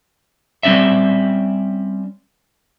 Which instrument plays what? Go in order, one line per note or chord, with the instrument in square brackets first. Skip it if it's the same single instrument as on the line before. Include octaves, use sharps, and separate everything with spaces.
[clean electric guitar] G3 C4 C#4 D5 E5